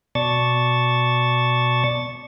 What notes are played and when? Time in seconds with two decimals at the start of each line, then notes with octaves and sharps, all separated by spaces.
0.15 B2 D5 A5 C#6 A6